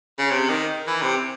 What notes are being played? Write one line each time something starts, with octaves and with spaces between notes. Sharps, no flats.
C#3
C3
D#3
E3
C3